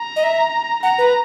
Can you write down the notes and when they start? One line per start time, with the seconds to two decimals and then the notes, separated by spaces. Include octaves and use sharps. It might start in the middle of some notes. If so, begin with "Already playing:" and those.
Already playing: A#5
0.16 D#5
0.23 E5
0.83 F#5 A#5
0.98 B4